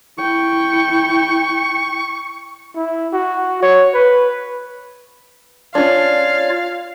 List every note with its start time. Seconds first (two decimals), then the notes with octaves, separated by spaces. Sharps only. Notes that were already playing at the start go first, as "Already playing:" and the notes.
0.19 E4 G5 C#6
2.76 E4
3.13 F#4
3.62 C#5
3.94 B4
5.75 C#4 D4 F4 C#5 D5 F5